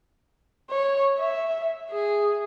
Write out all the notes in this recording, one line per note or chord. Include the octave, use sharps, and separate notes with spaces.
C#5
E5
G#4